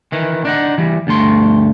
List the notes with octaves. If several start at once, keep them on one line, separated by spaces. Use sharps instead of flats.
D#3 E3
D4 D#4 F#5
E3 G3
D2 G2 A3 C6